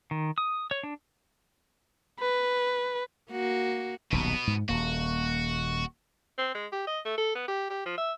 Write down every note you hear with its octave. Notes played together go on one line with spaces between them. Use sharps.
D#3
D#6
C#5
D4
B4
A#3 F#4
D#1 B1 B2 B3
G#2
D#1 A#3 F#4
C4
G#3
G4
D#5
A3
A4
B3
G4
G4
F3
E5